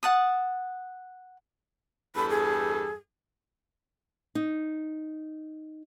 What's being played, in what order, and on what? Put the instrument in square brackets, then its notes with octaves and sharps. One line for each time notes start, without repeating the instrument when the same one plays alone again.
[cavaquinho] F#5 A5 D#6
[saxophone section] E2 G2 A4 [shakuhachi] B5
[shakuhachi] G#4
[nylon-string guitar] D#4